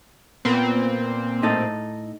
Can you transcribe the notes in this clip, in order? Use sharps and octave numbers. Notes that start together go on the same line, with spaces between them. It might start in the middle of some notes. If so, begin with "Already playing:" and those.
A#2 B3 C4
A2 D#4 A4